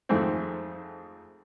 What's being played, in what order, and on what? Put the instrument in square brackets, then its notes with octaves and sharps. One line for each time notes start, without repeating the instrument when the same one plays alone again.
[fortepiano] F2 G#2 D#3 A3 C4